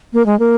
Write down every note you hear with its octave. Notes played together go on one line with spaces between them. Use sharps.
A#3
G#3
A#3